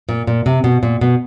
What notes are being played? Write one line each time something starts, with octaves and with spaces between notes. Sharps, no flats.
A#2
A#2
C3
B2
A#2
B2